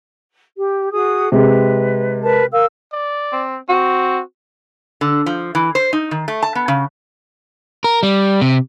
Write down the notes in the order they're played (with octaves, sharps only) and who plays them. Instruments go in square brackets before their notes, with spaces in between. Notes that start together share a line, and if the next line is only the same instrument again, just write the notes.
[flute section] G4
F#4 G#4 D#6
[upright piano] C3 G#3 [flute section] B4
[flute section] A#4 B4 A5
A#4 F5 E6
[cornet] D5
[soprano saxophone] C4
[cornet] C4 [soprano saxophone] F#4
[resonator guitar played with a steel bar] D3
F3
E3
C5
D#4
D#3
A3
A5
B3
C#3
[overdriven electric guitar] A#4
G3
C3